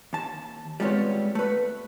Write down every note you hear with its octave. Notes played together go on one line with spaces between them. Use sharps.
D#2 A5
G3 G#3 B3 C4 F4 C#5
A3 B4